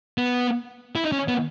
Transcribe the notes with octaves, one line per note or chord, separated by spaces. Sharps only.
B3
E4
D#4
C#4
B3